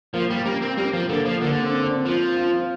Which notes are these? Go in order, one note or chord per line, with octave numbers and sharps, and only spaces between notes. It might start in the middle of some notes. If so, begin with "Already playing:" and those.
F3 A#3
G3
G3 A#3
C4
G3 A#3
F3
D3 A#3
F3
D3 A#3
C4
C4
F3 F4
F4